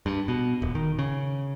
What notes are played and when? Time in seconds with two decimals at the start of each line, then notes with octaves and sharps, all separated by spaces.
0.06 G2
0.28 B2
0.62 D#1
0.75 D#3
0.99 C#3